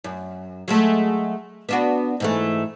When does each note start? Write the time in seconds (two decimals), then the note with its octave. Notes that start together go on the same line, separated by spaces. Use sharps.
0.04 F#2
0.68 F#3 G#3 A3
1.69 B3 D4 F#4
2.20 G#2 E3 A3